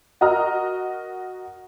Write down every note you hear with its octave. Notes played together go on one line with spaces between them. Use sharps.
F#4 A#4 D#5 A#5 D#6 F6